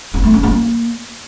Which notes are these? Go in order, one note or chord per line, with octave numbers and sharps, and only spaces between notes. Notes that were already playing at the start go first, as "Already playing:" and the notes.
C4
A3
C#4
A#3